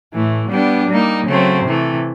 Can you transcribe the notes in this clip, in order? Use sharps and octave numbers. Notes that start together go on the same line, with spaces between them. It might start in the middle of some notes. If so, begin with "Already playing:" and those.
A2 E3 A3
G3 B3 D4 G4
G3 A#3 D#4
C#3 F#3 A3 C4
C3 E3 A3